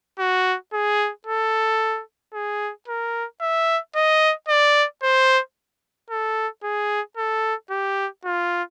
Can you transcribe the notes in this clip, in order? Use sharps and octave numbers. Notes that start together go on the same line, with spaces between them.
F#4
G#4
A4
G#4
A#4
E5
D#5
D5
C5
A4
G#4
A4
G4
F4